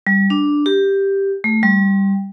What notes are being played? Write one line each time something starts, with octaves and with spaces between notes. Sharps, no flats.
G3
D4
G4
A3
G3